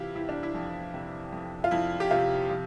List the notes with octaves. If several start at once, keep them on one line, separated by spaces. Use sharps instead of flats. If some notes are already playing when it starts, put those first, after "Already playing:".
Already playing: C3 E3 E4 F4 G4
E3 E4
D4
E4
F2
C3
F2
F4
F2 E4
G4
C3 F4
F3